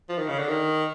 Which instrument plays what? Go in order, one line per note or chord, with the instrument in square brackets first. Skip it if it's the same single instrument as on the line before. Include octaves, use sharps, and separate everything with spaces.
[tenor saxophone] F3
D#3
C#3
D3
D#3